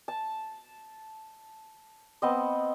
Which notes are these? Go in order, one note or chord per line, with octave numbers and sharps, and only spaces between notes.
A5
B3 C4 D#5